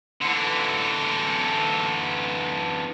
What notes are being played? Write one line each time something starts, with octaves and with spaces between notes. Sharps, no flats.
D3 E3